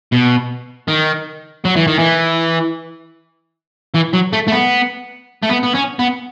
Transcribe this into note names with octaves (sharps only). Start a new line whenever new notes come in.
B2
D#3
F#3
E3
D#3
E3
E3
F#3
A3
A3
B3
A3
B3
B3
C#4
B3